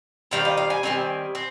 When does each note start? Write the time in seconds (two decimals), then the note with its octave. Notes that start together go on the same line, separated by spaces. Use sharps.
0.31 D#3 G3 C4 F5
0.45 D#5
0.57 F5
0.70 G#5
0.83 D#3 G3 C4 G#5
1.35 C4